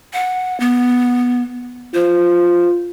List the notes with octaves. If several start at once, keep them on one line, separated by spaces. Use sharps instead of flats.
F#5
B3
F4 C5